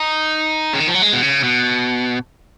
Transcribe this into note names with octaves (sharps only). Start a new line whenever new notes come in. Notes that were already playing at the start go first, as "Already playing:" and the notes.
Already playing: D#4
C#3
D#3
F3
F#3
G#3
B2
C#3
B2